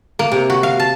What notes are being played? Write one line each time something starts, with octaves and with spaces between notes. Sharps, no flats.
A#3
C3
F#4
F5
A5